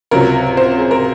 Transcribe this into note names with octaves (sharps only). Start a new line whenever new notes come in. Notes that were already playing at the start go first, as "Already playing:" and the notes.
C#2 C3 F#3 A#4
C5
G#4
A#4